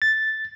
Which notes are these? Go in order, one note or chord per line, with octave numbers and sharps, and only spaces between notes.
A6